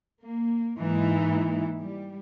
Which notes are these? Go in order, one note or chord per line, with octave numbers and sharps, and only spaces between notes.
A#3
G#2 E3 A#3 D#4 E4
G3